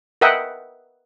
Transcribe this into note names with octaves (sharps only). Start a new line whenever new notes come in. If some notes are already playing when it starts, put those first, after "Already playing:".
A#4 B4 D#5 E5 F#5 G5